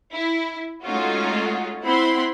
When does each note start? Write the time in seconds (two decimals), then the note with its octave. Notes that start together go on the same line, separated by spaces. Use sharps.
0.13 E4
0.85 G#3 A3 C#4 D#4 F4 F#4
1.84 C4 E4 F#5 B5 C6